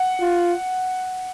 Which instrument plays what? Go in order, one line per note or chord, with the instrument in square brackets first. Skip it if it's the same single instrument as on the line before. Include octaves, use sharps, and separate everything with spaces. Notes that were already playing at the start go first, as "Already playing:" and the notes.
Already playing: [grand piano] F#5
[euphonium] F4